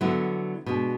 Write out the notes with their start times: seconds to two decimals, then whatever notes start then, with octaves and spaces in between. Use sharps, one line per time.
0.01 D3 F#3 B3 E4
0.66 B2 G#3 D4